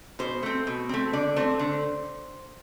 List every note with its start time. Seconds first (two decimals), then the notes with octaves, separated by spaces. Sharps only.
0.19 B2 C5
0.43 A3 C4
0.67 B2
0.89 A3 C4
1.13 D3 D5
1.36 A3 C4 C5
1.59 D3